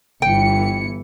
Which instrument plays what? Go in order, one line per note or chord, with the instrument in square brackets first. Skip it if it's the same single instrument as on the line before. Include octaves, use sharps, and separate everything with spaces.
[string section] G1 E3 C#7 [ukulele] G5